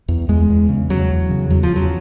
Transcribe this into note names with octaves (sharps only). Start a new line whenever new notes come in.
E2
E2 G#3
E2
C#3
C#3 F#3
E2
C#3
E2 F#3
F3
E2
F#3